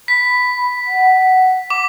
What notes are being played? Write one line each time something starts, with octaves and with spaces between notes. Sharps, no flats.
B5 B6
F#5
D6